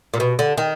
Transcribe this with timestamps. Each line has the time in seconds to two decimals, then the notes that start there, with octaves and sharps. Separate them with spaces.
0.14 A#2
0.20 B2
0.39 D3
0.57 D#3